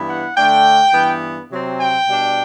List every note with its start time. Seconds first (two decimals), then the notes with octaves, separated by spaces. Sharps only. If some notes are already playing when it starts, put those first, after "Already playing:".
Already playing: G2 E3 B3 E4
0.09 F#5
0.37 D3 A3 D4 G5
0.93 G2 E3 B3
1.50 C3 F#3 C4
1.79 G5
2.08 B2 G3 D4